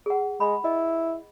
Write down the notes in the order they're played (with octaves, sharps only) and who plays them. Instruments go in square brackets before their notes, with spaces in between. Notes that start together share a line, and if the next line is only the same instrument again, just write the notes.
[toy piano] G#4 F#5
[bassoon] G#3 [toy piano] B5
[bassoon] E4 [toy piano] D#5